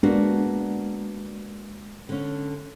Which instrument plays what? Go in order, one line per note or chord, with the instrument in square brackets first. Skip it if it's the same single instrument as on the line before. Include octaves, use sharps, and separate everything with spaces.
[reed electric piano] G#3 [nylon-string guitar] A#3 B3 F#4 [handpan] D4
[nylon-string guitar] D3 C#4